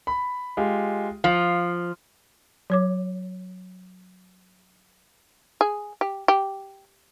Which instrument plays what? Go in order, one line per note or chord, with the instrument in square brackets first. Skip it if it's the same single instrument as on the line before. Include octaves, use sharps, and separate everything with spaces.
[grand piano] B5
G#3 F4 G4
[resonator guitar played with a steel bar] F3 [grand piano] F5
[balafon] F#3 C#5 D6
[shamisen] G#4
G4
G4